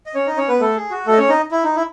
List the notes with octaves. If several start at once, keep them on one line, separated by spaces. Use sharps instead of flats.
D#5
C#4 C#5
D#4 D#5
C#4 C#5
B3 B4
A3 A4
G#4
F#4
A3 A4
D#5
C#4 C#5
D#4 D#5
E4
D#4
E4